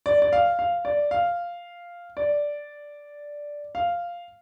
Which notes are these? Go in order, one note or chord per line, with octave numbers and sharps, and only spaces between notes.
D5
D5
F5
F5
D5
F5
D5
F5